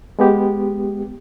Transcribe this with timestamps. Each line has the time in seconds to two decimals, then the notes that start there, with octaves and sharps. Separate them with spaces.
0.19 G#3 B3 G4